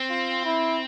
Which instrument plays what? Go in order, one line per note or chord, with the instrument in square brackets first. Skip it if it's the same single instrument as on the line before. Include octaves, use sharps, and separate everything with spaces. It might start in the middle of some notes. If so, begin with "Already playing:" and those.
Already playing: [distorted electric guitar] C4
[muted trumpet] F4
E4